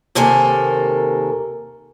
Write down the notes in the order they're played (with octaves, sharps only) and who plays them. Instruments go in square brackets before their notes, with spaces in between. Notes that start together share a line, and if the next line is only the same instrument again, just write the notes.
[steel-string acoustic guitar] D#2 C3 A#3 A4 A#4 G#5